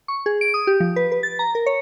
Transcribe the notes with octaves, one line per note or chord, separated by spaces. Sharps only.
C#6
G#4
D7
D#6
G4
F3
B4
B4
A6
A#5
A#4
C#5